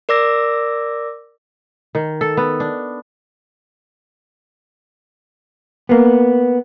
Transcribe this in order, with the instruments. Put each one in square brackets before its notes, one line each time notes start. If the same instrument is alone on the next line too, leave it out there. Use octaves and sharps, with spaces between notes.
[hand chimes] A#4 D5 D6 E6 A#6
[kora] D#3
A4
B3
D4
[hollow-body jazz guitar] A#3 B3